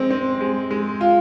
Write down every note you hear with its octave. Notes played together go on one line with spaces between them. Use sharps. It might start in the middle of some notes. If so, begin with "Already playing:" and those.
Already playing: G#3 C4
C4
G#3
G#3
F4